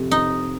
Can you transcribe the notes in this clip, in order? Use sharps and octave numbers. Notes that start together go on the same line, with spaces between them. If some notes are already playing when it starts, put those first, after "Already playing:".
Already playing: F2 C3
D#4